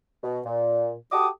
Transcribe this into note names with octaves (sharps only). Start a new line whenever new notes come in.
B2
A#2
F#4 G4 A4 D6 D#6